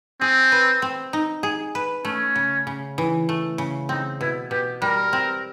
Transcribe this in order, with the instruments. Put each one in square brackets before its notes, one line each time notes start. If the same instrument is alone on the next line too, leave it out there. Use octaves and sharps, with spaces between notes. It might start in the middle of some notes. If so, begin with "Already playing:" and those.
[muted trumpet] C4 [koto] G#4
[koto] B4
C4
D#4
G#4
B4
[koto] A3 [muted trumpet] C#4
[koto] C#3
C#3
E3
A3
C#3
[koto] C4 [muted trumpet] D#4
[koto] B2 [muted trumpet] E4
[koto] B2 [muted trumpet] G4
[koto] G3 [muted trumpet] A#4
[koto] C4